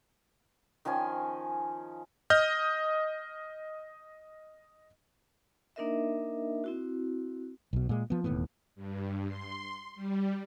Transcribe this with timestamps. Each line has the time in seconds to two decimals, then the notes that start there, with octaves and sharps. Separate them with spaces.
0.85 D#3 F3 C#4 G#5
2.30 D#5 D#6 F6 G6
5.76 A#3 D4 D#4 A#4 D#5 E5
6.64 C4 E4 F#4
7.73 B1 B2
7.89 A#2 G#3
8.10 F3 B3
8.24 E1 D#2 A2 B3
8.75 G2
9.27 C6
9.95 G3